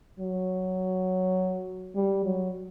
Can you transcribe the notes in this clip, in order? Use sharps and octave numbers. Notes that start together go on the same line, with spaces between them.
F#3
G3
F#3